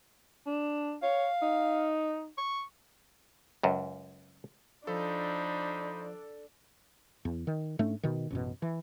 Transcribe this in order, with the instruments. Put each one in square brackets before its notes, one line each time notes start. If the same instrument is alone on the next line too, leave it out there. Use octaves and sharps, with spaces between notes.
[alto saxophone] D4
[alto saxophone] C#5 [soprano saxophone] F5
[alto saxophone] D#4
[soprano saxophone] C#6
[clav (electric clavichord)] C#2 F#2
[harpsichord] F3 [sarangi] D4 [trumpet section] D#4 C5 B5 [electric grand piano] A4
[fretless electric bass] E2
D#3
G#2 A3 C#4 D4
B2 D#3
A1 F#2 B2
E3